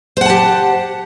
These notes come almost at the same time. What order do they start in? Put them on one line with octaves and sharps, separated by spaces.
C5 F#5 A5 G4